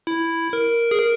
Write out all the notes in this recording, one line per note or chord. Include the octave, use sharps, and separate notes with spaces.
E4
A#4
G#4
A#4